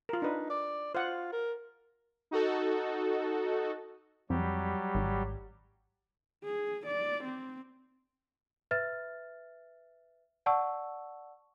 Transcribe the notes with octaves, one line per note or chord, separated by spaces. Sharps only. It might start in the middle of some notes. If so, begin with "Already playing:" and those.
F4 A#4
D4 D#4 B4
D5
F4 C5 F#5
A#4
D#4 F#4 A4
F2 F#3 G3 G4
G#1
G#4
D5
C4
B4 E5 F6 A6
D5 F#5 A5 C#6 E6